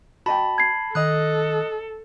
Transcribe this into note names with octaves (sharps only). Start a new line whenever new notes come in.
F#4 D#5 G5 A5 B5
G#6 C7
D#3 A4 D#5 D#6 F#6